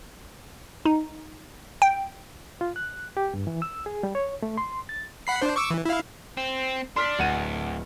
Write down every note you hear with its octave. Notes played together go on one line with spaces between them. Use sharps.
D#4
G5
F4
F#6
G4
G2
E3
E6
G#4
G3
C#5
A3
C6
A6
F#5 B5 C7
D4 C5
C#6 D6 E6
E3
E4 F5
C4
D4 C6 F6 B6
D1 D2 F#5 D#7